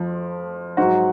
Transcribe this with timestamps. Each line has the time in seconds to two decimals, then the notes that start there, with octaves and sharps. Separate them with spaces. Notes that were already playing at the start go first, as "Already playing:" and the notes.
Already playing: F2 F3
0.77 G#2 F#3 F#4